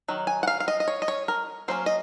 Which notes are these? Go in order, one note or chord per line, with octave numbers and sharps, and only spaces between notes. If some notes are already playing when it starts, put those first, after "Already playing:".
D#3 F#3
G#5
F#5
F5
F5
D#5
D#5
C#5
D#5
C#5
A#4
F#3 A#3 C#4 C5
D#5